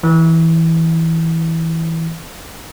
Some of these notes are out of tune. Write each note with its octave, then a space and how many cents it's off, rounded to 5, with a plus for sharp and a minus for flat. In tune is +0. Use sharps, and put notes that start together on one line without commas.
E3 -15